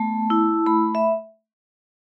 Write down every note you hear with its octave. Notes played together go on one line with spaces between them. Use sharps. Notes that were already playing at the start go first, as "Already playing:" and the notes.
Already playing: A3 B3 A5
E4
A3 B5
E5